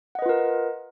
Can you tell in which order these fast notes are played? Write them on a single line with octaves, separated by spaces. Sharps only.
F#5 D#5 B4 F4 A#4